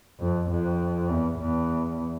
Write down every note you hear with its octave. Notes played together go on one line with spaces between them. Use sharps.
F2
F2
E2
E2